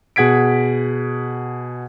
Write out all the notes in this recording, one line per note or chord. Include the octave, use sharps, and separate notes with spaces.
B2 G#4 F#5 G#6 B6 D7